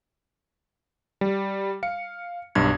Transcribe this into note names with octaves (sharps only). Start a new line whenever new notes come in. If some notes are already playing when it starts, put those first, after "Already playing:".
G3
F5 C#7
B1 G2 G#6